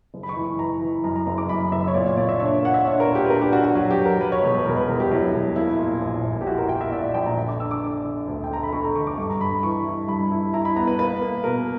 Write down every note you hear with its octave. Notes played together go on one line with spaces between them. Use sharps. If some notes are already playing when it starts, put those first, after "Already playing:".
F#1
B5
C#6
E3
C#6
E3 A#5
E3
F#2 A#5
A#5
F#1 A#5
D6
F#2 B5
F#1 E5
C#5
A#2 D5
C#5
A#2 D5
E5
D4 C#5
A#3 F#5
E5
D4 C#5
A#4
A#2
G4
B4
D4 A#4
G4
D4 F#4
F#4
F#3 F#4
G4
F#3
A#4
F#3 B4
C#5
E1
B4
E1 A#4
B4
E1 A#4
G4
F#3 E4
E1
A#3 E4
A#2
A#1
A#1
G4
E4 F#4
A#4
E4 G5
E5
A#2 D5
D5
A#1 G5
A#5
D3
D6
D4 E6
D6
D4
D3
D2
G5
D3 A#5
B5
D3 C#6
A#5
D3 C#6
D6
G2 C#6
A#5
G2 B5
E3 C#6
E4
G2 B5
E4
E4 A#5
B5
B3 A#5
B4
A#3 B4
A#3
B2 A#4